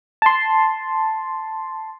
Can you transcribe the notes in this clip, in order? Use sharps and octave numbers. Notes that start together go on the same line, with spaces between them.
A5 C6